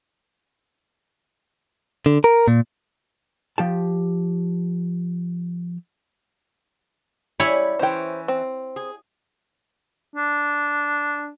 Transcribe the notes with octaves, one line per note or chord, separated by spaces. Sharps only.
D3
A#4
A#2
F3 G4 A5
G3 E4 C#5 G#5
E3 C#4 C5 G5
C4
G#4
D4